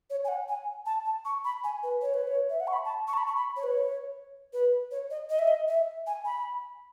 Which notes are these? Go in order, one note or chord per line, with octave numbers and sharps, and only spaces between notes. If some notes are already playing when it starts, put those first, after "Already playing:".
C#5
G#5
F#5
G#5
A5
A5
C#6
B5
G#5
B4
C#5
B4
C#5
E5
F#5
C#6
B5
A5
C#6
A5
B5
C#6
B5
C#5
B4
C#5
B4
C#5
D#5
D#5
E5
D#5
E5
G#5
B5